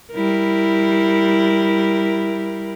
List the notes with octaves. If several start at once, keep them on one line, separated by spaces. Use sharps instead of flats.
G3 E4 A#4